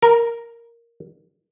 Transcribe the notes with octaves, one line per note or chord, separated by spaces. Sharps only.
A#4